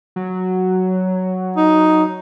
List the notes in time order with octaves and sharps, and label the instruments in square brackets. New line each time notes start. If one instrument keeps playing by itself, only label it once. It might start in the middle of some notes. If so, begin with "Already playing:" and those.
[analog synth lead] F#3
[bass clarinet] D#4